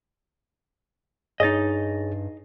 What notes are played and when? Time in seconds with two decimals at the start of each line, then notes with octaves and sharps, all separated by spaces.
1.40 G2 D#4 G#4 C#5 D#5 A6